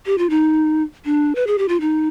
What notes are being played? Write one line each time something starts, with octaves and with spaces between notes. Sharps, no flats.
G4
F4
D#4
D4
B4
G#4
G4
F4
D#4